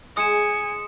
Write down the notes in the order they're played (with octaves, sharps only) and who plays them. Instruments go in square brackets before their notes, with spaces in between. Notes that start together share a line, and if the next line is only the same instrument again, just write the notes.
[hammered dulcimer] G#3 [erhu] G#5 [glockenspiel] D#6 E7 [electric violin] C#7